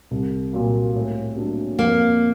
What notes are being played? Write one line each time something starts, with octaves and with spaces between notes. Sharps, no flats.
C2
A#2 F#3 A#3
A2
F#3 A#3 D4
F2 A#3